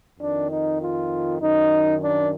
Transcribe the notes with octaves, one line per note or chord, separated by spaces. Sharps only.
F2 D#3 D4
D#4
F4
F#2 D#3 D#4
D4